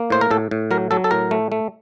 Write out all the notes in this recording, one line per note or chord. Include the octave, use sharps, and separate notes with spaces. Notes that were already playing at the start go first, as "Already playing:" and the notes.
Already playing: A#3
A2 C5
A#4
A2 A4
A2
F#3 A#4
F#3 A4
A4
A2 A#4
A3
A3